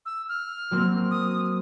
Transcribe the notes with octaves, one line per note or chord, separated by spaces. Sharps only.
E6
F6
F#3 A#3 C4
D#6